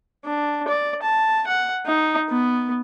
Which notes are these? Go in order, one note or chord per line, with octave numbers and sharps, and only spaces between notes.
D4
D5
A5
F#5
D#4
B3